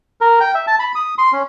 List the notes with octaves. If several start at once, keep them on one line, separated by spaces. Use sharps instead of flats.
A#4
G5
E5
A5
B5
D#6
C6
C#4